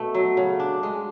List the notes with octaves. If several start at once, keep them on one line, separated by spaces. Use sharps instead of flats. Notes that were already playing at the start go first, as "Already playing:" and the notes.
Already playing: B2 A3
F#3
C#3
D4
G#3